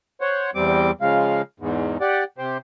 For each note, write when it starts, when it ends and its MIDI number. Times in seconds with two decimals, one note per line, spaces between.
0.21 0.50 72
0.21 0.50 73
0.21 0.50 78
0.55 0.91 40
0.55 0.91 55
0.55 0.91 60
0.55 0.91 86
1.01 1.42 49
1.01 1.42 53
1.01 1.42 56
1.01 1.42 77
1.60 1.97 40
1.60 1.97 44
2.01 2.24 67
2.01 2.24 74
2.01 2.24 78
2.38 2.58 48
2.38 2.58 67
2.38 2.58 72